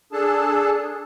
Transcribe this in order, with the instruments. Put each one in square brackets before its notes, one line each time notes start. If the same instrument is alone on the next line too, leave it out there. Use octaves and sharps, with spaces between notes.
[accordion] D4 G#4 A4 A5